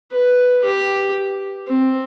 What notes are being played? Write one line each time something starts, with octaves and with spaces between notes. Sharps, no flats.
B4
G4
C4